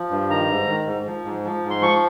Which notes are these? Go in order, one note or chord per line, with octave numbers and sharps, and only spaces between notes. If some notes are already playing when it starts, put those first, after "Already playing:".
Already playing: F3
G2
D#3 A#5
G#2
D#3
G#2
F3
G#2
F3
G#2
C6
F3 C#6